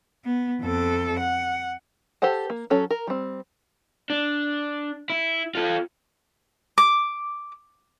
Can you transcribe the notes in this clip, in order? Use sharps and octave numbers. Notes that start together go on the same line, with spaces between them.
B3
F2 A4
F#5
G4 A4 C5 F#5 A5
A#3
F#3 C#4 A4
A#4
G3 C4
D4
E4
F4 A4
D6